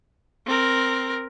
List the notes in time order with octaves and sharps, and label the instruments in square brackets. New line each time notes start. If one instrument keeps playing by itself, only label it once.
[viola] C4 A#4